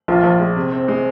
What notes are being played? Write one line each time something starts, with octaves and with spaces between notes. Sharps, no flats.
A#1 F4
A#1
G#3
C3
C4
G#3